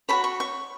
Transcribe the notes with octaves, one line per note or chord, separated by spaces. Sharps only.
F#4 A4 C#5 B5
C#6
C#6